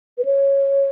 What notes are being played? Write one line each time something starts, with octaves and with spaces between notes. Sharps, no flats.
B4
C#5